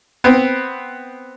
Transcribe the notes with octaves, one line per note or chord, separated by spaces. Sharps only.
B3 C4